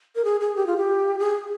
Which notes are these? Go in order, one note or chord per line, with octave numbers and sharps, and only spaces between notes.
A#4
G#4
G#4
G4
F4
G4
G#4